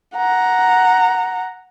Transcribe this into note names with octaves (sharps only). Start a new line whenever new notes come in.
F#5 A#5